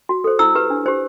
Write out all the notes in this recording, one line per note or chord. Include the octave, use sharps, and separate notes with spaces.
F#4
A4 C5
E4 E6
G4 B4
D4
G4 C5